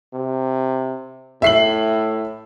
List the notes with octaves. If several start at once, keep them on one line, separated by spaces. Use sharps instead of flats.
C3
A2 E5 C7 F#7